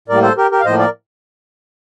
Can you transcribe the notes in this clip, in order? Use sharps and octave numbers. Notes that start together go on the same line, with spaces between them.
A2 G3 A#3 A#4 D5
A4 C5
G4 A#4
G4 A#4
F5
A2 F3 A#3 C5 D#5
A#4 D5